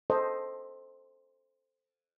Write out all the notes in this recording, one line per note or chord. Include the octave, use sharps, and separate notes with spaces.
A4 C5 D#5